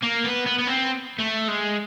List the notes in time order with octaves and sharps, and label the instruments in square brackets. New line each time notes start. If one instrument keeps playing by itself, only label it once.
[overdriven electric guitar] A#3
B3
B3
B3
C4
A3
G#3